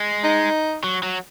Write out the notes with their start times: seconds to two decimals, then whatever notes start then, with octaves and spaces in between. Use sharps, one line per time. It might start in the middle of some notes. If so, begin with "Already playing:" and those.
Already playing: G#3
0.24 D#4
0.84 F#3
1.03 F#3